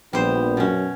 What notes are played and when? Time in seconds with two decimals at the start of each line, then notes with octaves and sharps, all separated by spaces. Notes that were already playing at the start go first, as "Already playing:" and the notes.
0.13 A#1 G3 B3 C5
0.57 F#2 B2 C#4